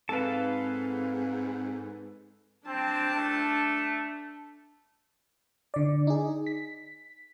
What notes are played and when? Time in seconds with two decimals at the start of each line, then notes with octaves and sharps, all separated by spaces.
0.09 G#2 C4 A4 B4 F5 A5
2.67 C4 D4 A5
3.15 A3
5.74 D3 D5
6.07 D#4 G#4
6.46 B6